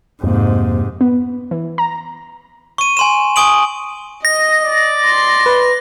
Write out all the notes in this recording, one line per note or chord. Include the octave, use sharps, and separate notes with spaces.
F2 G#2 C3 A#3
B3
E3
A#5
C#6 D#7
G#5 C6 E7
G#5 C#6 D#6 D7 F#7
D#5 A#6
D5
C6
B4